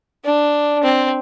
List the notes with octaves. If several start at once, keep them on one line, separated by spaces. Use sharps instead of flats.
D4
C4